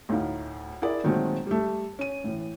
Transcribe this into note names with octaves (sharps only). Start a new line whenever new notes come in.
D2 A2 D#4 F5
E4 G#4 A#4 D5
A#2 D#3 F#3 G#3 A3 C4
G3 A3
C#4 D#7
A2 E3